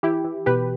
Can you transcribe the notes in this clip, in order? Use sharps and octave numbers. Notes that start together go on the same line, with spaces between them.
E3 E4 G4
E3
B2 G4 B4